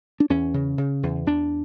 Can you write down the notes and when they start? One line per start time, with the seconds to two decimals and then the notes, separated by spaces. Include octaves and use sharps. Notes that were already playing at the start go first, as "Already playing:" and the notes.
0.20 D4
0.30 E2 C#4
0.54 C#3
0.78 C#3
1.03 E2
1.27 E2 D4